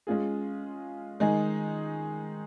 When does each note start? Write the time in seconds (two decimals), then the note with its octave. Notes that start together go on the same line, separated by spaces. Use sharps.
0.07 G#3 C#4 F4 G#4
1.20 D#3 G#3 D#4 G#4